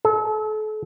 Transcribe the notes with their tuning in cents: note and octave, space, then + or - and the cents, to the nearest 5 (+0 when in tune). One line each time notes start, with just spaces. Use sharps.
A4 -40